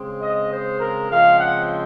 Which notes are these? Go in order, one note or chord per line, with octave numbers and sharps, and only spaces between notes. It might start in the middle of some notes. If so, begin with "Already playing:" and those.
Already playing: C#3 G#3 C4
D#5
C5
A#4
C#3 F3 G#3 C4 F5
F#5